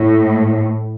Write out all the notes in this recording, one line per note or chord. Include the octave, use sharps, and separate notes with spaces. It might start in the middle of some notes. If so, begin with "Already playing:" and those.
Already playing: A2